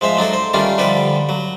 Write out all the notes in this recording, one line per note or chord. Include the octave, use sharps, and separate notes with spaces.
F3 G#3 C5 E5
F#3 D4 D#4 A4
C5
D#3 G3 A3 C#4 D4 F4
D3 F3 G3 A4 B4
F#3